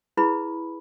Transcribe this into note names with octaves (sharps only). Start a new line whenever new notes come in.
E4 G#4 B4 B5